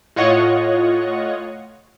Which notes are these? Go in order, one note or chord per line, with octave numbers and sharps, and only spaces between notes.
A2 F4 C#5 D#5 F#5 C#6